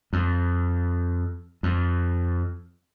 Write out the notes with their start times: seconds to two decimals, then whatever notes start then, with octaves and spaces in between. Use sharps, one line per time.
0.13 F2
1.63 F2